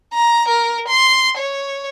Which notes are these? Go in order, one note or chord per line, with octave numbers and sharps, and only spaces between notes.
A#5
A#4
C6
C#5